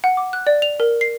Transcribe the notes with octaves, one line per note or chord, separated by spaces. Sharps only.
F#5
D6
F#6
D5
F7
A#4
C7